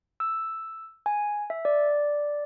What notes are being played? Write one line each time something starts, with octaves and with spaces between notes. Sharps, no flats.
E6
G#5
E5
D5